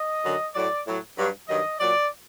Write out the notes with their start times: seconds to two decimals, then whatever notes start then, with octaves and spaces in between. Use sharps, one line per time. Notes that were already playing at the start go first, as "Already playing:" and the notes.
Already playing: D#5
0.22 F#2 D3 F#3
0.54 A2 F#3 D5
0.86 A2 F#3
1.17 G2 F#3
1.48 G2 D#3 F#3 D#5
1.79 A#2 F#3 D5